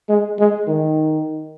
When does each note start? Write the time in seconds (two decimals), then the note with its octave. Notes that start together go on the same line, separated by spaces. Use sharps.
0.09 G#3
0.39 G#3
0.67 D#3